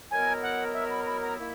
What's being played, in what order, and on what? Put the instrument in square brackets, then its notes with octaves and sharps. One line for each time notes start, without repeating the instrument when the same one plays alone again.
[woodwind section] B2 F#3 B3 E4 A#4 [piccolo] G#5
[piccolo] F#5
E5
B5
B5
A#5
[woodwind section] D#3 A#3 E4